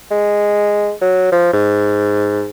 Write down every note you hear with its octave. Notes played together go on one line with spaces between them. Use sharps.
G#3
F#3
F3
G#2